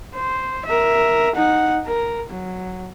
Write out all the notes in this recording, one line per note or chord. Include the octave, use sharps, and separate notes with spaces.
C5
A#4 E5
D#4 F#5
A#4
F#3